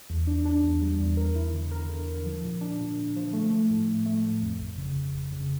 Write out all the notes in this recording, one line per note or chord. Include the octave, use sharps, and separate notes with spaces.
E2
D4
D4
E2
G3
E2
A#4
E4
D3
A#4
D3
D3
F3
A#2
D4
A#2
A#2
F3
A3
A3
A2
A2
A3
A2
F2
G1
C#3
G1
G1
C#3